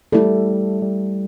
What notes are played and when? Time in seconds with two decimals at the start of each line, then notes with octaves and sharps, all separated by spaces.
0.12 G3 A3 E4 A4
0.82 G3